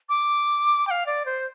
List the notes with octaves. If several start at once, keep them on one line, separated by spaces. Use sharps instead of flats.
D6
G5
F5
D5
C5